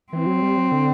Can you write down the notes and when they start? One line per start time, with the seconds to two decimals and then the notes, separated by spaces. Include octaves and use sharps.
0.13 E3 C4
0.26 F#3
0.42 G3
0.57 F#3
0.72 D3